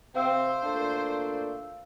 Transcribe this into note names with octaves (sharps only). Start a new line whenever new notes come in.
C3 C4 C5 F5 E6
A#2 A3 D4